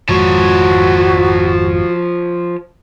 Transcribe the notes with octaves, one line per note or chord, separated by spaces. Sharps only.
G#1 F2 F3 G#3 F#4 C#5